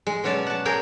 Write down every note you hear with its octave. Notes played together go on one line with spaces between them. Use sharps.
G#3
B2 F#3 C#4 C#5 D5 A5
F#5 A5
G#4 A#4 C#5 G5